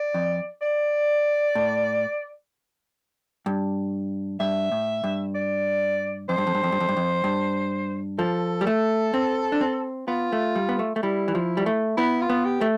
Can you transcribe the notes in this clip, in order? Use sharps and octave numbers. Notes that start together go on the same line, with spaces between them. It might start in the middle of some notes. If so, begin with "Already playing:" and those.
Already playing: D5
F2
D5
A2
G2
G2 E5
A2
G2
D5
F2 C5
G2
F2
G2
F2
G2
F2
G2
F2
G2
F3 A4
G3
A3
C4
D4
C4
B3 F4
A3
G3
B3
A3
A3
G3 E4
E3
F3
G3
A3
B3 E4
F4
B3
G4
A3